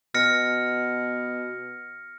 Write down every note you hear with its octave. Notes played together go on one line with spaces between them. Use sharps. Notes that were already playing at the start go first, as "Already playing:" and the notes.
B2 F6 A#6 C#7